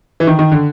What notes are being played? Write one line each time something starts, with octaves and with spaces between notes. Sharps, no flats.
E3
D#3
D#3
D3